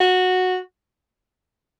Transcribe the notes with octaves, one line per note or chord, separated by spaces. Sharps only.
F#4